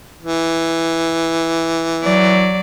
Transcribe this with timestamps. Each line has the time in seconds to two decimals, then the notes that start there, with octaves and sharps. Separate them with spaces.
0.23 E3
2.04 F#3 D5